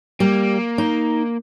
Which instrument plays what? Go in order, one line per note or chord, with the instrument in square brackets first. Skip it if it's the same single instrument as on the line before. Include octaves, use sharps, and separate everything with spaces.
[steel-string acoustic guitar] G3 [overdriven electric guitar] A#3
[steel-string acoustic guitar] D#4